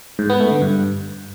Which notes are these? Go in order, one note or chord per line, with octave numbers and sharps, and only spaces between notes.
G#2
B3
A3
D3
G2